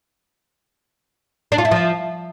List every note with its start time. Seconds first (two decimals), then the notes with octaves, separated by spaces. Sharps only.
1.52 D4
1.58 F4
1.65 E4
1.71 F3